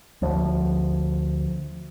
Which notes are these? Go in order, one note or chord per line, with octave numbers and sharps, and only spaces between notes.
D2 F3